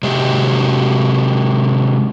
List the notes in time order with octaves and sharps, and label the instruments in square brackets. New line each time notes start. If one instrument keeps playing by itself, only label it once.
[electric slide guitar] C3 F#3 G#3 G4